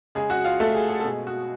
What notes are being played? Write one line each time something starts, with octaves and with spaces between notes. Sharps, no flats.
C#3 G#3 G#4
F#4 F#5
F4 F5
A3 A4
G#4
G#4
A4
B2 G#3 G#4
F#4